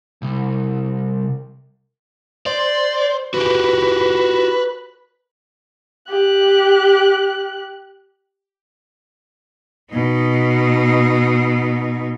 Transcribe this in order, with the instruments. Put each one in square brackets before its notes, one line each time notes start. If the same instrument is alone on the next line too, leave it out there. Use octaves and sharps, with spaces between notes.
[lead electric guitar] C2
[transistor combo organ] C5 [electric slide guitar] D5
[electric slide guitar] F#4 G4 [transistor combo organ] B4
[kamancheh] G4 F#6
[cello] B2 D#4